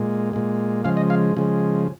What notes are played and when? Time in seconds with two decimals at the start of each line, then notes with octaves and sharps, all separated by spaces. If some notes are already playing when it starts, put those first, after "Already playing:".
Already playing: A#2 G#3
0.33 A#2 G#3
0.84 C#3 F3 G#3 F5
0.97 D#5
1.10 F5
1.37 C#3 F3 G#3